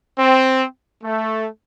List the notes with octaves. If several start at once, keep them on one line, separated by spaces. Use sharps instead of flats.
C4
A3